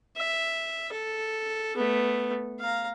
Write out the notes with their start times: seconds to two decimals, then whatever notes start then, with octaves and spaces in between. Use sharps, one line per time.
0.17 E5
0.92 A4
1.77 A3 B3
2.60 F5 A#5